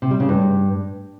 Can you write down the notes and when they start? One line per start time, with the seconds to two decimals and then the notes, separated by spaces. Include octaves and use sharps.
0.02 C3
0.11 G3
0.20 C#3
0.29 G2